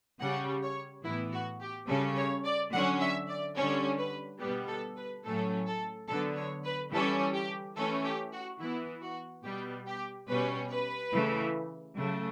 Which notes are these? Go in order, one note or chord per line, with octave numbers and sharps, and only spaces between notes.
C#3 G3 C#4 F#5
C#5
A2 E3 B3 E4
F#4
G4
C#3 G3 C#4 A4
C#5
D5
D3 F#3 C#4 F#5
E5
D5
D3 G3 C#4 C#5
B4
B2 G3 B3 G4
A4
B4
A2 F#3 A3 C#4 A4
A4
D3 F#3 B3 A4
C#5
B4
E3 G3 C#4 A4
G4
E3 A3 C#4 A4
G4
F#4
E3 B3 E4
F#4
B2 G3 B3 G4
G4
B2 G3 C#4 B4
B4
C#3 E3 A3
C#3 F#3 A3